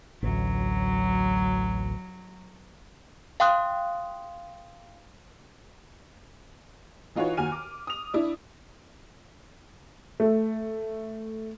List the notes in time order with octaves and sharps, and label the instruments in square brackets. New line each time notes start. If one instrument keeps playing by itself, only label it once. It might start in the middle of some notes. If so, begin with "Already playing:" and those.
[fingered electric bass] A1 D2 [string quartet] F#3
[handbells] F5 G5 C6 D#6 F#6
[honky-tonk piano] E3 D#4 F4 F#4 B4 C#5
D#2 F#4 G#5 F6 D#7
D6
D#6 F7
D4 E4
A3